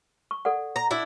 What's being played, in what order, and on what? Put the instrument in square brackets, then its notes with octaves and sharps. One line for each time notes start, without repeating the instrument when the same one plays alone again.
[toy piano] C#6
A4 D5 F#5
[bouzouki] A#5
D4 E4